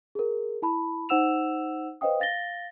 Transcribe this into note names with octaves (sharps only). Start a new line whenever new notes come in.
G#4 A#4
E4 A5 B5
D#4 C5 F#5 E6 E7 F7
B4 C5 D#5 F5 G5 D#6
F5 A6 A#6 G7